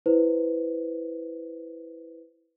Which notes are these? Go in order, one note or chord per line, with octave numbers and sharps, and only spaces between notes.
E4 B4 C5